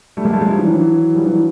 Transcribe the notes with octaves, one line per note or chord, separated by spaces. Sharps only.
G3 A3
G#3 A#3
G3 A3
F#3 G#3
F3 G3
E3 F#3
D#3 F3
E3 F#3
F3 G3
E3 F#3